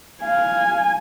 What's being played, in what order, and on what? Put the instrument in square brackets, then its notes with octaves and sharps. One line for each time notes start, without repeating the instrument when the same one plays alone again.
[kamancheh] F5 [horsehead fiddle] G#5